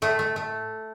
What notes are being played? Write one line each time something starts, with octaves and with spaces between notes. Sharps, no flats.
A2 A3
A3
A3